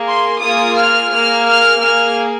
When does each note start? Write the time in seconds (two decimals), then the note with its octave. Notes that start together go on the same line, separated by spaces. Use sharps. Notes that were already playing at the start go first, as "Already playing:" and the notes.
Already playing: A#3 G#4
0.08 C6
0.42 A#3 F4 G#4 D#6
0.77 F6
1.11 A#3 G#4 F6
1.46 F6
1.81 A#3 G#4 F6